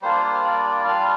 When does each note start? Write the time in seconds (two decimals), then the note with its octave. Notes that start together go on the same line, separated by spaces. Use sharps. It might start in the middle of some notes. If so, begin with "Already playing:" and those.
0.02 G3 A#3 D4 F4 C5
0.23 C5
0.34 F5
0.44 D5
0.65 D5
0.85 G3 D4 F4 F5